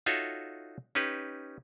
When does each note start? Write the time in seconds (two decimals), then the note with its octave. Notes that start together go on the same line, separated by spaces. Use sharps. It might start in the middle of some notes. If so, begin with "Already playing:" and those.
0.06 D#4 F4 F#4 A4 C#5 E5
0.95 C#4 D#4 G4 B4